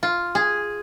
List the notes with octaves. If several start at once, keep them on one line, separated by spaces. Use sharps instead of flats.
F4
G#4